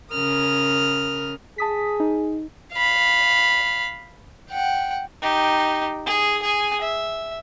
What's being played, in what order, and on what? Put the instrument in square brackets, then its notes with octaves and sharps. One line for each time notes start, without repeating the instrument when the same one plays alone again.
[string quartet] C#3 A#4 D#6 F6
[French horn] G#4 [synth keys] A5 D#6 B6
[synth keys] D#4
[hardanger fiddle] F5 B5
F#5 G5
D#4 G4
G#4
G#4 G#5
E5